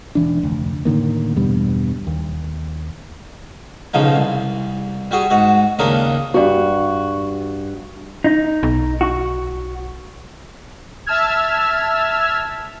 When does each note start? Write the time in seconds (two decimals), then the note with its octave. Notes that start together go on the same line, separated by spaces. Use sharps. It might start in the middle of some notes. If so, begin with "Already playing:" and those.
0.15 E1 E3 D4
0.43 F1 D2
0.85 A2 D3 D#3 A#3
1.36 E2 G2 B2 G3
2.07 D#2
3.94 B1 C#3 F3 D#4
4.16 C2
5.11 G3 F#4 G#4
5.30 G#2 F#4
5.79 D#2 C#3 A#3 D4 A#4 D#6
6.34 G2 F#4
8.24 D#4
8.63 B1
9.01 F#4
11.06 E5 A5 E6 F6 G#6